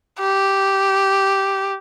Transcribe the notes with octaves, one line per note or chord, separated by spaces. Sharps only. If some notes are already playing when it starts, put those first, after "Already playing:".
G4